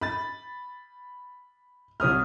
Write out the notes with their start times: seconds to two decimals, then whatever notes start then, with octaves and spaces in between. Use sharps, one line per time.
0.01 B5 A6
2.00 C2 C#5 D#6 F6